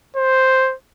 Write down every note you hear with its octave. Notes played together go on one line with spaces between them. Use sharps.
C5